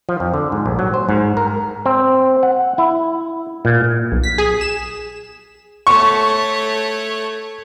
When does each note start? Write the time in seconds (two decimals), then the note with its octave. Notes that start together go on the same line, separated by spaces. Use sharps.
0.09 F3
0.20 F2
0.34 D3
0.52 G#2
0.66 A#1
0.79 F#3
0.94 C5
1.09 G#2
1.37 A#4
1.86 C4
2.43 F#5
2.78 E4
3.65 A#2
4.12 B1
4.23 B6
4.38 G#4
4.61 E7
5.87 A3 C#5 C#6